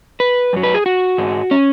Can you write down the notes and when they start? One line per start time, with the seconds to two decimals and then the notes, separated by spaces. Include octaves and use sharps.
0.20 B4
0.53 F#2 F#3
0.63 B4
0.74 G#4
0.86 F#4
1.18 G#2 G#3
1.51 C#4